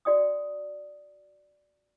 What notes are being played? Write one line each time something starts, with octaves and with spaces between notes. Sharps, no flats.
F#4 D5 G5 D#6